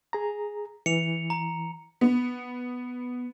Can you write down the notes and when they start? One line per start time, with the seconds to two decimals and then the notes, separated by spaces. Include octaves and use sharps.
0.13 G#4 A#5
0.86 E3 C#7 F7
1.30 A#5
2.01 B3